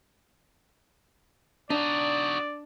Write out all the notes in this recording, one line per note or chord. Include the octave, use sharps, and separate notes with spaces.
D4 D#4 F#4 D5